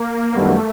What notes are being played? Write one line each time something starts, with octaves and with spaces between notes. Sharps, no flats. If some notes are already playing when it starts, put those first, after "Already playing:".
Already playing: A#3
F#2 D#3 G3 A3 B3